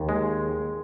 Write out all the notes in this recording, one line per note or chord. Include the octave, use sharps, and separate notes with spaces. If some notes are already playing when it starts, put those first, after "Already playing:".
Already playing: D#2
G#3